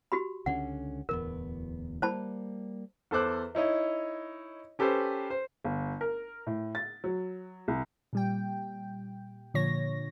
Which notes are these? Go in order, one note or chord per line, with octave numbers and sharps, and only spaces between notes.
F#4 G4 B5
C#2 D3 C#4 F#5
D1 E2 B3 A#4
G3 A#3 C5 A5 B5
E2 A4 C5 D6 F#6
D#4 E4 C#5 D#5
C#4 G4 A4 B4 C5
C5
G1
A#4
A2
A6
F#3
C2
A#2 G3 G5
A#2 D3 F3 C#5 A#6